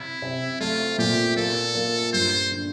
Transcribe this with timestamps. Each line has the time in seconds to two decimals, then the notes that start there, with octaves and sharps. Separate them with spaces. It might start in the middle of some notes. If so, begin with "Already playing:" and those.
Already playing: C3 E4
0.22 C3
0.60 A3 F4
0.98 A#2 G4
1.37 A#3 A4
1.75 A#3
2.13 G2 C5
2.51 D3